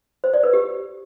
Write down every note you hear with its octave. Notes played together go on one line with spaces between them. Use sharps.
C5
D5
B4
G4